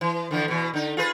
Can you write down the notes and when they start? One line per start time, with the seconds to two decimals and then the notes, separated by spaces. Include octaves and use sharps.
0.01 E3
0.31 D3 E3 F3
0.48 B2 E3
0.73 D3 D#4
0.97 F4 G#4 B4